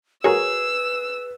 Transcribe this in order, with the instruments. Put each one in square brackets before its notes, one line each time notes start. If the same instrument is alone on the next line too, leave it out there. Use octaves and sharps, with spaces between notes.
[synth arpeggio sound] F#4 A#4 C#5 [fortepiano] G#4 [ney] B4 [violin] E6